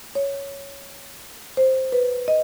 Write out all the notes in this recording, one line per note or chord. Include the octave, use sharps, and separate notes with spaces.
C#5
C5
B4
D#5